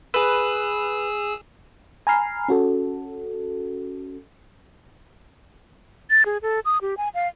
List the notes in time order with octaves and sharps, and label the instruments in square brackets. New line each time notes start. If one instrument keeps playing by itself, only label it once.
[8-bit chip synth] G#4 E6 [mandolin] B4
[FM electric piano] G#5 A#5 B5 F6 C7
C#4 F#4 A4
[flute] A6
G#4
A4
D#6
G4
G#5
F5